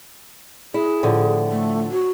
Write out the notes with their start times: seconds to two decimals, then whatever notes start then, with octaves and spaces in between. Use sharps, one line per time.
0.74 E4 G#4
1.03 A2 D3 F3
1.50 A3
1.91 F#4